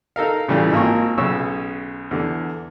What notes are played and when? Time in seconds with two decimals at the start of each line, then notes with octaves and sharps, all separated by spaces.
0.16 D#4 A4 A#4 F5
0.48 A2 C#3 E3 G3 A3 F4
0.72 G#1 A#3 F4 C#6
1.18 B1 C#3 C#4 C#6 E6
2.11 E2 D3